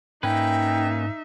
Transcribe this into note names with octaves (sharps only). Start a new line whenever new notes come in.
G#2 A#3 C#4 D#4 B4 E5 G5